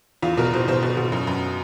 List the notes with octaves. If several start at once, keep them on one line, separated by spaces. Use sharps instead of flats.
E2 F4
B2 A#4
B2 C5
B2 C5
B2
B2
F#2
F#2